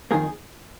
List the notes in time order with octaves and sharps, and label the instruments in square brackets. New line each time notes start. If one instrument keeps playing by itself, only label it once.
[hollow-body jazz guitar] F2 D#3 A#3 G#4